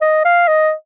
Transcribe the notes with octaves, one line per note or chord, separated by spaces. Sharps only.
D#5
F5
D#5